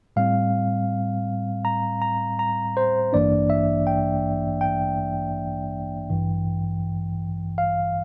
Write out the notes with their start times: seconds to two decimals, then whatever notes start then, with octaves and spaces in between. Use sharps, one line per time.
0.16 A2 G3 C4 F5
1.65 A#5
2.02 A#5
2.39 A#5
2.77 C5
3.13 A1 G2 E3 A#3 D4 D5
3.50 E5
3.87 G5
4.61 G5
6.10 A1 G2 E3
7.58 F5